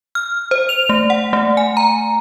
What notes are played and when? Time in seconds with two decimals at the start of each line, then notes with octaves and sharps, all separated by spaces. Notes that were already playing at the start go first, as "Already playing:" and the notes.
0.15 F6
0.51 C5
0.69 F7
0.89 A3
1.10 F#5
1.33 A3
1.57 G#5
1.77 A#5